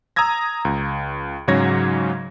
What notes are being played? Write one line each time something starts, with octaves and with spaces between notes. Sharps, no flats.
A#5 D#6 E6 G#6 A#6
C#2
G#2 C#3 F#3 C#5 G#6 A#6